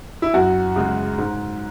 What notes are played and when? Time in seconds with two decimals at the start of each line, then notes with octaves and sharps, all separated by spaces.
0.22 E4
0.34 F#2 F#4
0.76 C#3 G#3
1.18 G#2